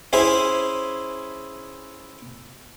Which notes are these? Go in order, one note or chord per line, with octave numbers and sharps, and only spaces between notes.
C#4 E4 G#4 C5